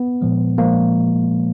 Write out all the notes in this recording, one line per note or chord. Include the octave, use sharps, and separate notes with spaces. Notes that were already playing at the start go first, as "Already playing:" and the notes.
Already playing: B3
A#2 F3 G#3
A#2 F3 G#3 A#3